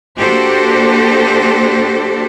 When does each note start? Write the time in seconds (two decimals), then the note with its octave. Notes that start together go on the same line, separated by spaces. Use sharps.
0.17 A#3 D4 F#4 G4 A4 C5